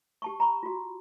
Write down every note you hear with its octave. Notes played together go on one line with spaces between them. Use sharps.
G4 A5 C#6
A#5 B5 C#6
F4 F#4